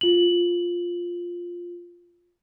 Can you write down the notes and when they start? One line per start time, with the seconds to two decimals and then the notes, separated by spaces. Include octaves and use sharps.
0.01 F4 F#7